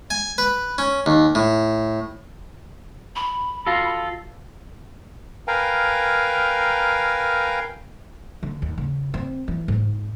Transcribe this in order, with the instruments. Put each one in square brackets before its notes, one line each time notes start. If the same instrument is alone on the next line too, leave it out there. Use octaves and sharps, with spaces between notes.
[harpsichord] G#5
B4
C#4
D#2
A2
[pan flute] B5
[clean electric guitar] F4 A4 [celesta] F#4 F5 A#6
[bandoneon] A#4 B4 F5 G5 G#5 A#5
[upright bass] D3
D#2
C#3
C4
E3
G#2